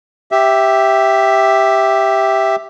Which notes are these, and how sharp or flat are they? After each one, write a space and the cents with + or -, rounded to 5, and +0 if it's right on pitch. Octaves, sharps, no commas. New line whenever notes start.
G4 +0 E5 +0